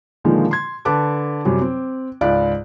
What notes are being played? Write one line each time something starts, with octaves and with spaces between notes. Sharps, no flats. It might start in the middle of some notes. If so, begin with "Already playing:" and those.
A#2 D3 D#3 F3 G#3 A#3
C6 G#6
D3 B4 A5 D6 F#6
F#2 C3 F#3 G3
C4
C#2 G#2 D5 F5 B5 F#6